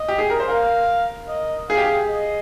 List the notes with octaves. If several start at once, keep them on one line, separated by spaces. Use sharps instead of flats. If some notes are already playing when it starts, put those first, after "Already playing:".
Already playing: D#5
G4
G#4
A#4
C5
A#4 F5
D#5
G#4 F5
G4
G#4
D#5